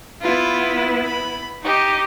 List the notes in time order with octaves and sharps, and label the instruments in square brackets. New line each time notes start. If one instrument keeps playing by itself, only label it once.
[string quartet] B3 E4 B4 [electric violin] F4
[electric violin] B5
[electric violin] D#4 [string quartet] G4 D#5